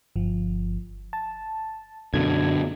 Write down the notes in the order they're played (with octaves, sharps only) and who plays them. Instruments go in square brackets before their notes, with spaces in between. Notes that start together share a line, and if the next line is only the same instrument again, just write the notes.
[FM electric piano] G1 F3
A5
[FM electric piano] F#2 G#6 [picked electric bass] B2 D3